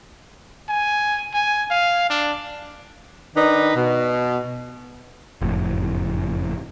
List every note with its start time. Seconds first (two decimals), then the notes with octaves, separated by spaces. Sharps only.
0.69 G#5
1.34 G#5
1.71 F5
2.10 D4
3.36 D#3 D4 D#4 B4
3.75 B2
5.42 F#1 F2 A2